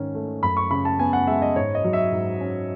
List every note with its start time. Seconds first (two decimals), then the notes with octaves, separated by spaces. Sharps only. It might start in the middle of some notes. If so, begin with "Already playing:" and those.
Already playing: G#2 D#3 C#4
0.14 A3
0.43 F#2 B5
0.57 C#6
0.71 C#3 B5
0.85 A5
0.99 B3 G#5
1.13 F#5
1.27 G#3 E5
1.42 D#5
1.56 G#2 C#5
1.75 D#5
1.84 F#3
1.93 E5
2.12 G#2
2.41 C#4